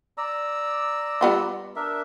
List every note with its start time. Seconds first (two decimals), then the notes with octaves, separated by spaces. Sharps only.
0.18 D5 A#5 E6
1.21 G3 B3 F4
1.76 D4 A#4 E5